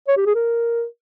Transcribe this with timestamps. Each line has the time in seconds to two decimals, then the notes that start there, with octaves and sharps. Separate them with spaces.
0.08 C#5
0.17 G4
0.26 G#4
0.35 A#4